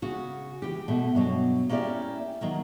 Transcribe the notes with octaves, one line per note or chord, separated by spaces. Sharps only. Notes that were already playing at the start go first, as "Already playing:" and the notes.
C#3 F#4
E3 G4
B2 A3
G2 B2 F#3
A#3 C#4 E4 G4 D5
D#3 F#3 A#3